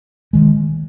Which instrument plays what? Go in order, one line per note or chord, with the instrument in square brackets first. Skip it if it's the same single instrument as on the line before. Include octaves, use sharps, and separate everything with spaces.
[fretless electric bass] D#3 G#3